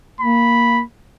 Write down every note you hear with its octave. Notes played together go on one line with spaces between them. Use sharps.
A#3 B5